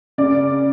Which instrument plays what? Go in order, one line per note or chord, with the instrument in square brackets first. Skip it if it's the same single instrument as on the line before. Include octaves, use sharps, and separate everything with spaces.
[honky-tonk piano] C#3 D5